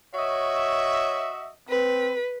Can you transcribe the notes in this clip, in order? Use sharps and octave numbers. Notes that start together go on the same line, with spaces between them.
F#4 C#5 D#5 E5
C4 B4